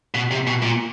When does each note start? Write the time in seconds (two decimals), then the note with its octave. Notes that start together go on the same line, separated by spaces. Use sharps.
0.15 B2
0.31 C3
0.47 B2
0.62 A#2